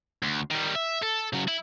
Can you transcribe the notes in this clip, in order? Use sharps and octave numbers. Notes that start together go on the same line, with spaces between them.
D2
D#3 G3
E5
A4
C#3 F#3
E4